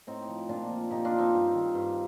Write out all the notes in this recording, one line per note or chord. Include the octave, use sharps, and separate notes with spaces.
A2 C4 D#4
F3
A#2 D4 F4
F3
A#2 D#4 G4
D4 F4
F3
C4 D#4
G2
D#3
G2